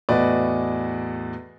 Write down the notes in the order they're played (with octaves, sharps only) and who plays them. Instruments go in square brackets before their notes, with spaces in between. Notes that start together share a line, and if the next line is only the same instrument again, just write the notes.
[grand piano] E2 A2 F#4 B4 D5 D#5